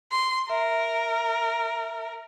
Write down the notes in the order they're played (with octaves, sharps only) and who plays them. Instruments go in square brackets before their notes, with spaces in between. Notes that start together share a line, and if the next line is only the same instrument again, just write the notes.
[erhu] C6
[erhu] A#4 [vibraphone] E5